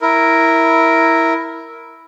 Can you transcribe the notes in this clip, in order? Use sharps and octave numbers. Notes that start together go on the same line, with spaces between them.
E4 A#4